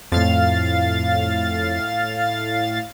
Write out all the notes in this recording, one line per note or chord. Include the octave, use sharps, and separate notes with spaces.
F2 A2 F5 A6